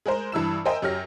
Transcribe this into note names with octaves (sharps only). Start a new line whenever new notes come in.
G#3 G#4 A#4 C5
G2 E3 E6 E7
A#4 C5 D#5 E5 G5 G#5
F#2 G4 C#5 F6 A#6